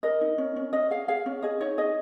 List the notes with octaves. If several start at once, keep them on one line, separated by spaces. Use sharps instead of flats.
A#4 D#5
D#4
C#4
C#4
C#4 D#5
G#4 F5
G#4 F5
C#4
G#4 D#5
D#4 C#5
G#4 D#5